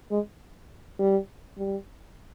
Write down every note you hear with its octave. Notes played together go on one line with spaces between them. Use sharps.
G#3
G3
G3